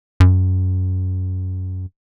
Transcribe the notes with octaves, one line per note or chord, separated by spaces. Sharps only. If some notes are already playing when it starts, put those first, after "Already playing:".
F#2